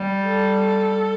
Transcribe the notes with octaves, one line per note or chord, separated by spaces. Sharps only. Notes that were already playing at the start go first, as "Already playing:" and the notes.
Already playing: G3
A4